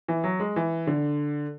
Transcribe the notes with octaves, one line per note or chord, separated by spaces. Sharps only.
E3
F#3
G#3
E3
D3